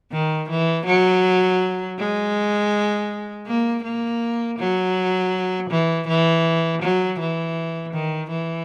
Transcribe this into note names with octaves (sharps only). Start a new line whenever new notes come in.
D#3
E3
F#3
G#3
A#3
A#3
F#3
E3
E3
F#3
E3
D#3
E3